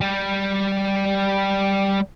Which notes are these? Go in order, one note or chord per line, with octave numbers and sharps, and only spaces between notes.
G3 G4